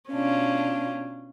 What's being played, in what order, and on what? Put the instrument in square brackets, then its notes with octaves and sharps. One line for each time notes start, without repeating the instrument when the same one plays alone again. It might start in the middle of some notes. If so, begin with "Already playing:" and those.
[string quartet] B2 D4 F4 [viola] C#4